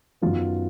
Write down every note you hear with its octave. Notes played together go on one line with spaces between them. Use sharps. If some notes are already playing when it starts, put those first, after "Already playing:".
F#2 D#3 F#3 B3 F4